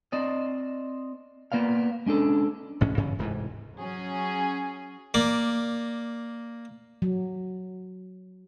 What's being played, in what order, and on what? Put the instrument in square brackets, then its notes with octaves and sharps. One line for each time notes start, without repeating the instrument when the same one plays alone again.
[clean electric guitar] C4 D5 D#5
A#3 B3 D5 F5
G#3 C#4 D4 A4
[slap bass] A1 G#2 C#4
G2 C#3 E3 C#4
D1 G#2 C3 E3
[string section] F#3 C#4 G#4
[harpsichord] A#3 D5
[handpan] F#3